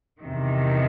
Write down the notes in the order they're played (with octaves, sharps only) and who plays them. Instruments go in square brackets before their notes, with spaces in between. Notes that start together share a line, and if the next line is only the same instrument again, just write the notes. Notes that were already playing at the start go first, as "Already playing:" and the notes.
[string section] E2 C3 D#3